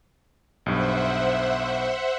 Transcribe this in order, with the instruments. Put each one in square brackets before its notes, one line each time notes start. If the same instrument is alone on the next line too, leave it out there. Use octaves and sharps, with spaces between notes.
[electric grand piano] B1 G2 [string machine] C5 E5 F#5